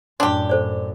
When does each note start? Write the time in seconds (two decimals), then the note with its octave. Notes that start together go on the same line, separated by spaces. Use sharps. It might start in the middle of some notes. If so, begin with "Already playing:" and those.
0.20 F#2 A2 D4 G4 C6
0.50 A4 C5 D5